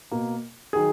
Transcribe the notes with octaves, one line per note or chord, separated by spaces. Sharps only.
B2 A#3
D#3 F#3 G#4